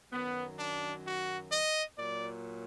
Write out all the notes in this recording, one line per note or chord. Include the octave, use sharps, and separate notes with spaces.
F#2 D#3 F#3 B3
D4
F#4
D#5
A#2 F#3 D5